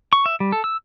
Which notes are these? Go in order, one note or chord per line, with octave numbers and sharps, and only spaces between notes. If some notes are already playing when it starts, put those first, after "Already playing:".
C#6
E5
G3
A4
E6